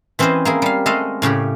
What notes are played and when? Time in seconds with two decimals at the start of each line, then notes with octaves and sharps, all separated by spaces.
0.19 E3 C4 C#4 B4 C5 D#5
0.45 A#3 E4 G#4
0.62 G3 F5
0.86 G#3 A3 A4 D#5 F5
1.22 A2 C#3 C#4 G4